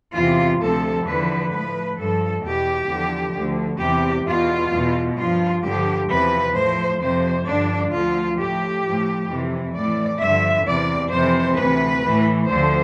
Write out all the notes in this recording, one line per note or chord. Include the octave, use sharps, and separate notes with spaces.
E2 C3 E3 F4
D2 C3 F3 A4
E2 D3 F3 B4
A2 F3 B4
G2 F3 A4
E2 B2 G4
E2 D3 F3
D2 D3 F3
E2 C3 E3 G4
E2 B2 F4
E2 B2
G2 F3 F4
G2 D3 F3 G4
E2 C3 F3 B4
A2 F3 C5
F2 C3 F3 C5
G2 D3 F3 D4
D2 D3 F3 F4
A2 F3 G4
A2 F3
F2 C3 E3
A2 E3 D5
G2 D3 F3 E5
E2 C3 E3 D5
F2 C3 E3 C5
D2 C3 E3 B4
A2 E3
D2 D3 F3 C5